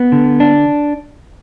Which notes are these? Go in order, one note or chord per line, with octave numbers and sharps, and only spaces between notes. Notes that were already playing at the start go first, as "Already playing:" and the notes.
Already playing: B3
D3
D4